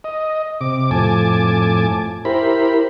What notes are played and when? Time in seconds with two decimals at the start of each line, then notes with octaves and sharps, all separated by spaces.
0.04 D#5
0.61 C3 D6
0.91 F2 A2 G#5 A5 D6
2.25 E4 G4 A#4 C5 B5